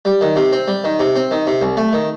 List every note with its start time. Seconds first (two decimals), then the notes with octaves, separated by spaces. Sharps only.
0.05 G3
0.21 D#3
0.36 C3
0.52 C4
0.68 G3
0.84 D#3
0.99 C3
1.16 C4
1.31 D#3
1.47 C3
1.61 C2
1.77 A3
1.93 D#3